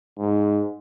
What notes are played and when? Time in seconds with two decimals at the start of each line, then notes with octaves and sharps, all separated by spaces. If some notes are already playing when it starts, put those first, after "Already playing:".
0.19 G#2